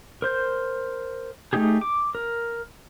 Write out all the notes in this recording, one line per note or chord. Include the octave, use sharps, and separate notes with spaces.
A#4 C5 G6
A3 A#3 D#4 G4 G#4
D6
A#4